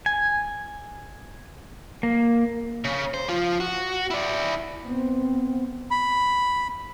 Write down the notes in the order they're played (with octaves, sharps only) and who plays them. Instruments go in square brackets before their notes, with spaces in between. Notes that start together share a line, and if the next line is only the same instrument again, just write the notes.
[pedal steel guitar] G#5
A#3
[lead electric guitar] C#3
C5
F3 F4
F#4
E4 D5
[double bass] B3 C4
[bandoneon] B5